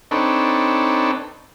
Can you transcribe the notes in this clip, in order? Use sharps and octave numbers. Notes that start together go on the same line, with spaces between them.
C4 D4 D#4 A4 B4 C#5